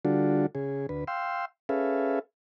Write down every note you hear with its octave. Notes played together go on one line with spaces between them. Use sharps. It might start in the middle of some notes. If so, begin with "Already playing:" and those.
D3 G3 D4 F4 F#4 A4
C#3 G#4
D2 B4
F5 G5 C6 E6
C#4 G#4 A4 B4 E5 F5